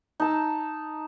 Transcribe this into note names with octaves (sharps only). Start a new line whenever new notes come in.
D#4 A5 E6